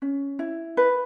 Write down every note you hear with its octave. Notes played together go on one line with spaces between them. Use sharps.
C#4
E4
B4